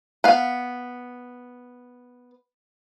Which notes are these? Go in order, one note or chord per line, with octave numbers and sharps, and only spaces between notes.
B3 F5